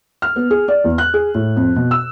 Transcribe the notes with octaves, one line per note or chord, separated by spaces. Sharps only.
F6
B3
G#4
D5
E2
F#6
G#4
A2
F2
B2
E6